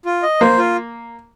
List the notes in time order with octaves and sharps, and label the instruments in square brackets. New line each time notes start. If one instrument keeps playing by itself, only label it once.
[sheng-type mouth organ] F4
D#5
[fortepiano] A#3 [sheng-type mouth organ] C5
[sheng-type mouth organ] F4